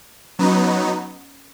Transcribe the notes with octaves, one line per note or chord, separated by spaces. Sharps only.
F#3 B3 C#4 D#4